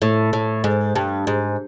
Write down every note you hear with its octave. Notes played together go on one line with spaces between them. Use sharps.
A2
A2
G#2
G2
G#2